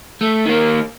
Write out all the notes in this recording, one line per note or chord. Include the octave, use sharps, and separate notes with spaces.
A3
D#3 A#3